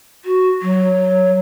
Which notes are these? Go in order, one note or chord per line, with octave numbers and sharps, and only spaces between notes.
F#4
F#3